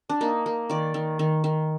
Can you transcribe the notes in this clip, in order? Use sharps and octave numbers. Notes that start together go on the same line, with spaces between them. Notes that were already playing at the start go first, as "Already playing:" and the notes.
D4
A#3 D#4
A#3
D#3 D5
D#3
D#3
D#3